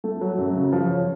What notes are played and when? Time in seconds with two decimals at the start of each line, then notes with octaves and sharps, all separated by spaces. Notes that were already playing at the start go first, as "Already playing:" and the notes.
0.04 A3
0.21 F#3
0.38 F#2
0.56 C#3
0.73 F3
0.90 C#4